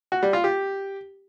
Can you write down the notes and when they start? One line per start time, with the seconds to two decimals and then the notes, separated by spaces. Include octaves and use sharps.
0.12 F#4
0.23 G3
0.33 F4
0.44 G4